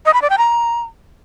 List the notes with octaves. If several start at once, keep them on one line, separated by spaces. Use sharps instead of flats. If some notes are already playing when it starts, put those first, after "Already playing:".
D#5
B5
D5
G5
A#5